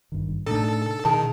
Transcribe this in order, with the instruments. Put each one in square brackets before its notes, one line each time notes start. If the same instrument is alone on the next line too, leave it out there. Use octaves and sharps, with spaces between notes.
[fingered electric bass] G#1 G2 D#3
[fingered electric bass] A2 C3 A3 [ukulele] D4 D#4 [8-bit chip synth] A4
[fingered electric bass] B2 [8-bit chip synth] D#3 [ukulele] E4 G#4 A5